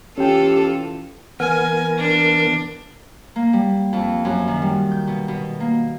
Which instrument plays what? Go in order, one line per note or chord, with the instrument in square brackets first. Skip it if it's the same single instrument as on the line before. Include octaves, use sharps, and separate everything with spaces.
[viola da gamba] E3 F4 A4 [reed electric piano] C#4 G5 [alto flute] G4
[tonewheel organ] E3 B3 A#4 [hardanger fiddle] G#5
[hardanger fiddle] D4
[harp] A#3
G3
F2
F#2
D#3
G3
G6
B2
B2
A#3